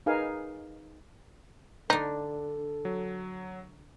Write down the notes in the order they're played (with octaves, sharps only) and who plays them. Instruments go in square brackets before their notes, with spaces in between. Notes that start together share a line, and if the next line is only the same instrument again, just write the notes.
[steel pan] D#4 G#4 A#4 B4 F5 G#5
[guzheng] D3 D4 [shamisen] D#4 [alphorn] A4
[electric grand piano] F#3